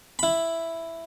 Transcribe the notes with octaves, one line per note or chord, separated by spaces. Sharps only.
E4 B5